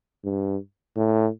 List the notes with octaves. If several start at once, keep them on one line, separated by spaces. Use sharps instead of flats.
G2
A2